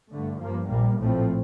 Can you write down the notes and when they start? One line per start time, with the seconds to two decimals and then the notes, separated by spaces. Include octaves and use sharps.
0.11 G2 D3 A3
0.40 G2 F3 A#3
0.69 A#1 A#2 G3 A#3
0.97 A#1 A2 F3 A3 C4